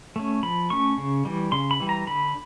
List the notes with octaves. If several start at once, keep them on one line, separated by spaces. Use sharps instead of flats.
A3 C#4
F3 B5
A3 C#4 C#6
C#3
E3 G3
C#3 C6
B5
E3 G3
A#5
D3 B5